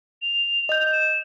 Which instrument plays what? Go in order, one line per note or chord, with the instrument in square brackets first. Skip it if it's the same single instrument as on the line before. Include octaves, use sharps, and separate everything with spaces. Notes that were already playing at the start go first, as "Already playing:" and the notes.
[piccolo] F7
[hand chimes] D#5 G6
[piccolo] E7